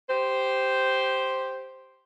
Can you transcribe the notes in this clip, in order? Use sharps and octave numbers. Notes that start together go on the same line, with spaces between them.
G4 C5